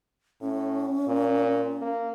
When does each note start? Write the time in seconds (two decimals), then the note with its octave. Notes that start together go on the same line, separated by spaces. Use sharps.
0.41 A2 C#4
1.08 A#2
1.81 A#3